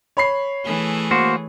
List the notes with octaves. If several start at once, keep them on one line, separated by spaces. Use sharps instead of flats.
C#5 B5 C7
E3 A3 G#4
A#3 F#4 C5